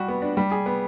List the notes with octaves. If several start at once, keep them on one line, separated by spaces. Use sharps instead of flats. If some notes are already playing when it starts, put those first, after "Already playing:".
Already playing: G3 F#4
B3
D4
G3
G#4
B3